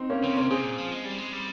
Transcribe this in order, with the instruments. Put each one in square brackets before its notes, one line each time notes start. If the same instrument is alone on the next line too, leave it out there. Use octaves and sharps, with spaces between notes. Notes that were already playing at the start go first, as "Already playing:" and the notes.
Already playing: [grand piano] C4 D#4
A#3 C#4
[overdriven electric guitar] C#3 [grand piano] C4
[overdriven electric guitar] C3 [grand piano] A#3 C#4
[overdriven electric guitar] C3 [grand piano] G#4 C5
[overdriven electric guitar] A#2
F3
G#3
G3
G#3
G3